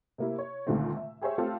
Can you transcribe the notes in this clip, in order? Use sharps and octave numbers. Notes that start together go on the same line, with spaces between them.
C3 A#3 E4
C#5
C#2 A#2 D3 D#3 A3 C4
E5
G4 G#4 C5 C#5 E5
A3 C4 F4 G4 A4